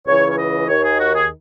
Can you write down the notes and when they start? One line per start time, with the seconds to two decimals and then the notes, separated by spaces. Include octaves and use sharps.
0.06 C#2 C#3 E3 C#5
0.30 C#5
0.38 D#5
0.68 D#2 D#3 C#5
0.84 G#4
0.99 F#4
1.15 G#4